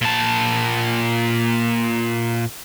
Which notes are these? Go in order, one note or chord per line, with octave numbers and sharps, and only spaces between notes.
A#2 A5